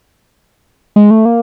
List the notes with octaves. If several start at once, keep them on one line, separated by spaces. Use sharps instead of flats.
G#3
A3
A#3